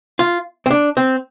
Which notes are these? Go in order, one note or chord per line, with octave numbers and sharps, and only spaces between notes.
F4
C4
D4
C4